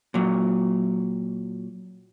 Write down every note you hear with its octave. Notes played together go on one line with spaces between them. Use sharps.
A#2 F#3